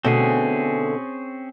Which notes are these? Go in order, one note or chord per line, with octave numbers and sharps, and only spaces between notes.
B2 D3 A3 C4 C#4 G#4